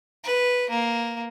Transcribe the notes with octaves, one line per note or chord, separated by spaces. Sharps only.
B4
A#3